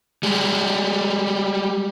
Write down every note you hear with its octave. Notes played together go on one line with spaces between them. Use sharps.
G3 G#3